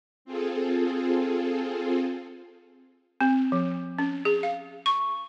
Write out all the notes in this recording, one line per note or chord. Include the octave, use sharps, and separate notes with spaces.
C4 F4 G#4 A4
C4
F3
C#4
G#4
F5
C#6